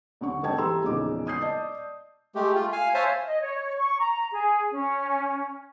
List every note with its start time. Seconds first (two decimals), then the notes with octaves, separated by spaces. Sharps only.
0.21 D#2 D3 C#6
0.43 G#1 A4 D#5 G5 A5 G#6
0.58 E3 G4 A4 A#5 C6 E6
0.83 E1 A#1 C#3 D#4 D6
1.27 D#6 G6 C7
1.41 D5 D#5 A5
2.35 G#3 A3 G4
2.55 A3 F4
2.72 F5 G#5
2.94 C5 C#5 E5 F5 G#5 A5
3.26 D#5
3.42 C#5
3.78 C#6
4.00 A#5
4.31 G#4
4.71 C#4